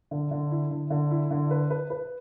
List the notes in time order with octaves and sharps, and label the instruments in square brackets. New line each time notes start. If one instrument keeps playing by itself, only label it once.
[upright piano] D3
D3
E4
D3
D3
E4
D3
B4
B4
B4